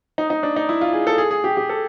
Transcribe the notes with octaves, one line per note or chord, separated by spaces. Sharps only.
D#4
D#4
D4
D#4
E4
F4
G#4
A4
G#4
G#4
G4
G4
A4